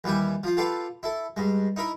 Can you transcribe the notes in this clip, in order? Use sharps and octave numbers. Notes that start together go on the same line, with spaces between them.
D#2 E3 G3 G4 G#5
F3 F4
F4 G4 A4 B4 F5
E4 A4
G2 G#3
D#4 E4 A#4 B5